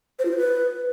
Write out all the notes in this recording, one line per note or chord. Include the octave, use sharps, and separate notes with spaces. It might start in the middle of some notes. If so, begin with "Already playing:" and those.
C5
F4
C5
B4